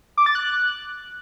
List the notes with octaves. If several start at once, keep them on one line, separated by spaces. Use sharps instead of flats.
D6
A6
F#6